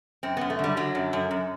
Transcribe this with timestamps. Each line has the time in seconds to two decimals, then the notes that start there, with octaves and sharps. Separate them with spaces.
0.23 F#2 C4
0.37 F#2 B3
0.50 A3
0.59 D3 G3
0.77 D3 F#3
0.95 F#2
1.13 F#2
1.31 F#2